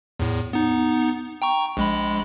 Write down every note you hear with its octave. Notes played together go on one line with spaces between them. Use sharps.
E2 A2
B3 D#4
G5 A#5 C#6
A#1 G#3 B5